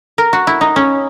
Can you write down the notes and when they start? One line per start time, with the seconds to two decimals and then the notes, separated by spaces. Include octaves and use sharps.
0.18 A#4
0.33 F#4
0.47 E4
0.61 D#4
0.76 C#4